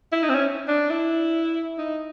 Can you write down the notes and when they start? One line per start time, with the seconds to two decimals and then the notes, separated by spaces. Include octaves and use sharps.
0.12 E4
0.23 D#4
0.30 C4
0.35 C#4
0.68 D4
0.90 E4
1.78 D#4